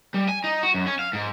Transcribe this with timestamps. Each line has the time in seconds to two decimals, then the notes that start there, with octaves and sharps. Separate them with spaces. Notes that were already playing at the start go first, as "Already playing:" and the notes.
0.14 G3
0.29 G#5
0.44 D#4
0.63 F#4
0.74 F#2
0.87 C#4
0.99 F5
1.13 G#2